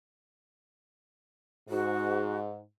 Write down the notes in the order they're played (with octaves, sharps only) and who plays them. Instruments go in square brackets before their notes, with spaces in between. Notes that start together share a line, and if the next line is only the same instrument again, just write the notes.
[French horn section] G#2 [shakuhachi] F#4